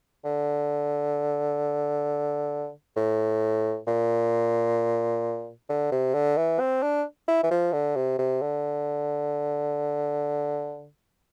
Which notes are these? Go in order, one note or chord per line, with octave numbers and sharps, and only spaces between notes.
D3
A2
A#2
D3
C3
D3
E3
C4
D4
E4
E3
F3
D3
C3
C3
D3